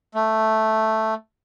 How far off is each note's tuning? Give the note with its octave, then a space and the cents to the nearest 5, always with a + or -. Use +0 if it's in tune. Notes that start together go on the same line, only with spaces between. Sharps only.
A3 +0